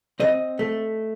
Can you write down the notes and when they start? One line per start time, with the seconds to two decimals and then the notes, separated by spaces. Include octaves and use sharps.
0.20 C4 D#5
0.59 A3